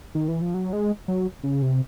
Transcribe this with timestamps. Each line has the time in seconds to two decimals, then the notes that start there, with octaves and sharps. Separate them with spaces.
0.15 D#3
0.28 E3
0.41 F3
0.54 F#3
0.73 G#3
1.08 F#3
1.44 C#3
1.62 C3